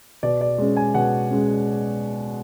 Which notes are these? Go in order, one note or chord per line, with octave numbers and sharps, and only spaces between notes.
B2 D5
D5
G#3 C#4
G#5
B2 F#5
G#3 C#4